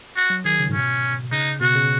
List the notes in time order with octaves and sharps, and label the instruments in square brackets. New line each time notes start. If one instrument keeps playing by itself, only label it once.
[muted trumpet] F#4
[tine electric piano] F#3
[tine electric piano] D#3 [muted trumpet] G#4
[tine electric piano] C#3
G#2
[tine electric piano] B2 [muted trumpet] C#4
[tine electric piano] C#3 [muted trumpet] D#4
[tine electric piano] B2 [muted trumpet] F#4
[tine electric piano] C#3